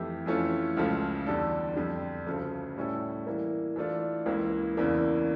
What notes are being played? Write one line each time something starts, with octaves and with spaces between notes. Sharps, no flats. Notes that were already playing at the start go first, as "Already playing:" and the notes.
Already playing: F2 E3 A3 E4 G4
F2 E3 A3 C#4 F4
C#2 C#3 F3 A3
E2 D3 G3 D4 A4
F2 D3 G3
D2 C#3 F3 A3
A2 G3 C#4 E4 A4
E3 G3 A#3 E4
E3 A3 D4 F4
C#2 C#3 E3 A#3
E2 C#3 E3 A#3 D4